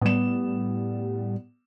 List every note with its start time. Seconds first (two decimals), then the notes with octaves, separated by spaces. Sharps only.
0.02 A2 G3 B3 E7